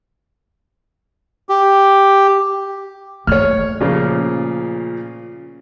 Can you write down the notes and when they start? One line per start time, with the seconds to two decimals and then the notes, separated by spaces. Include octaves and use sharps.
1.49 G4
3.27 A3 C#5 F6
3.81 A#2 C#3 F3